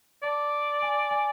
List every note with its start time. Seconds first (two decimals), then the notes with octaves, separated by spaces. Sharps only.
0.23 D5 A5
0.82 G#5
1.11 G#5